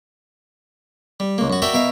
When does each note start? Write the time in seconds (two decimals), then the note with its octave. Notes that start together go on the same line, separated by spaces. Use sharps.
1.20 G3
1.38 C#2 A#3
1.50 F#2 F#4
1.62 F#4 A#4 D5 E5 G5
1.74 B2 A#4 E5 F5